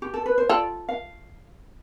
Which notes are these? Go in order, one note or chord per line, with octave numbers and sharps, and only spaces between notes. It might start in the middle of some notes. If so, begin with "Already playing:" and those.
G4
A4
B4
C5
F4 A4 D5
F5